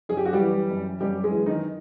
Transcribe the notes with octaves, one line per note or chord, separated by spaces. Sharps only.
F#2 G#4
G4
F#4
G3 G4
E3
F#2
F#2 G3 G4
G#3 G#4
E3
D#3 D#4